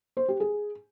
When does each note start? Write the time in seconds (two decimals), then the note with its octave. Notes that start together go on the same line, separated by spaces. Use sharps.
0.17 C5
0.28 G4
0.40 G#4